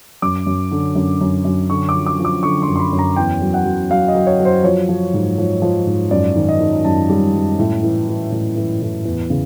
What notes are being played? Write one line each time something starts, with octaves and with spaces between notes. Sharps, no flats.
F#2 D6
F#2
D3
F#2
F#2
F#2
D3 C#6
D6
F3
D6
F3
D6
D3 C#6
C6
F#2
C6
B5
F#2
A#5
E2 G5
F#3
F#5
F#3
F#3 F5
D#5
F#3
C#5
F#3
C5
F3 C#5
F3
G#2
F3
F3
G#2
F#2 D5
D#3
D#5
D#3
F#2 A5
G3
F#2
A2
E3
E3
A2
E3
A2
E2
C#3